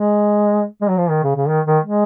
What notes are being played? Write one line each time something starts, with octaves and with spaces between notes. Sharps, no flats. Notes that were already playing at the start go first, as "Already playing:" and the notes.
Already playing: G#3
G#3
F#3
F3
D#3
C#3
C#3
D#3
D#3
G#3